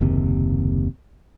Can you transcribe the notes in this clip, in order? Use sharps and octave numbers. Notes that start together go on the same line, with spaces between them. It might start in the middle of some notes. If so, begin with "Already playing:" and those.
F#1 D#2 C3